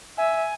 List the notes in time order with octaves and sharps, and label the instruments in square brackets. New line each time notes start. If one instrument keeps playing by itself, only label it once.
[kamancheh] E5 [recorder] G#5